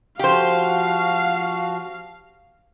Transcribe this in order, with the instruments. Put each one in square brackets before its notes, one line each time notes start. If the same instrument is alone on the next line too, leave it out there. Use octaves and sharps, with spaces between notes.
[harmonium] F3 F#4 [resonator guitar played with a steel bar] G4 C5 [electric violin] F5